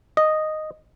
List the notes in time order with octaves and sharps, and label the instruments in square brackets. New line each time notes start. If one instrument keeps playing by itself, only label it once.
[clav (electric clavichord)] D#5